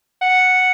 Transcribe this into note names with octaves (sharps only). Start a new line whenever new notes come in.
F#5